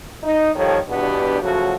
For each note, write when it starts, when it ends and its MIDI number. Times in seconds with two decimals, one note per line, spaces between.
0.23 0.50 63
0.55 0.78 51
0.55 0.78 53
0.55 0.78 55
0.55 0.78 69
0.55 0.78 73
0.89 1.40 40
0.89 1.40 43
0.89 1.40 47
0.89 1.40 59
0.89 1.40 62
0.89 1.40 67
1.42 1.74 49
1.42 1.74 53
1.42 1.74 54
1.42 1.74 57
1.42 1.74 66